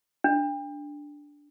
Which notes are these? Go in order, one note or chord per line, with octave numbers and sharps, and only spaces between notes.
D4